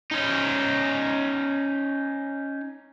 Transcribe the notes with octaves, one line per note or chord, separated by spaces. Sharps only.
C#4 D#4